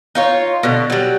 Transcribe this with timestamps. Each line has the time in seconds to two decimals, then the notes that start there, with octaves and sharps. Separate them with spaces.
0.15 D#4 F4 C#5
0.63 B2 D3
0.90 F#3 G3